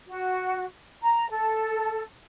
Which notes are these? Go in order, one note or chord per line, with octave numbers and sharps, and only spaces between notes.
F#4
A#5
A4